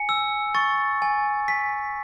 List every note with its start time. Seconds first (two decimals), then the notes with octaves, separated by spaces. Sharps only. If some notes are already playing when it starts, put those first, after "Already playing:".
Already playing: G#5 C#7
0.09 E6
0.55 C#6 A6
1.02 G#5
1.48 G#5 B6